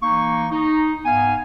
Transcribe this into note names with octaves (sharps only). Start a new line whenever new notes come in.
E3 A#3 D#4 C#6
D#4
G#2 B3 F5 G#5